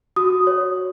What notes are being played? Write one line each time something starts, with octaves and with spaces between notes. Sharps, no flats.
F#4 D#6
C#5